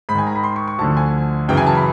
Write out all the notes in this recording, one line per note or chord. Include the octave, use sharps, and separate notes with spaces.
G#2 B5
D#3 G#5
A#5
B5
C6
C#6
C#6
D2 D3 F3 A5
G#5
F#2 C#3 E3 G5
G#5
A5
B5